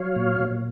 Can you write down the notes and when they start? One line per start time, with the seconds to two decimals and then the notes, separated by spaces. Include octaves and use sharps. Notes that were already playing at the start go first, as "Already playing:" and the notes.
Already playing: F#3 C#5 F5
0.16 A#2
0.40 A#2